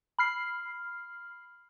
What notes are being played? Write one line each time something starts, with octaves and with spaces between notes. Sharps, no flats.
B5 F6 C7